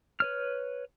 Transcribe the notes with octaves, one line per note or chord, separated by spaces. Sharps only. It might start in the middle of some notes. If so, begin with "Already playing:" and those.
B4 C#5 F6